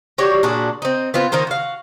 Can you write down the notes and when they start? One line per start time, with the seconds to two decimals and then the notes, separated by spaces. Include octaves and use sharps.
0.18 F#4 G4 C#5 D5
0.43 A#2 D4 F#4 G#4
0.82 C4 D#4
1.14 B3 C4 F4
1.32 D#3 A#3 D#4 C5
1.47 F#4 F5